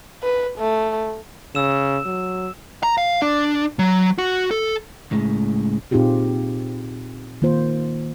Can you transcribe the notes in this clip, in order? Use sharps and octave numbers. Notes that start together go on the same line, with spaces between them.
B4
A3
C#3 E6 E7
F#3
A#5
F5
D4
F#3
F#4
A4
C#2 A2 G#3 C#4
A#2 C4 D#4 F4 G4 G#4
D#3 A#3 F4 C5